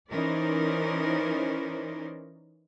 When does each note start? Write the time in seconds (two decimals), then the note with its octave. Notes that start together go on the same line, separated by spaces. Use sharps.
0.11 E3 C#4 D#4 A#4 C5 D5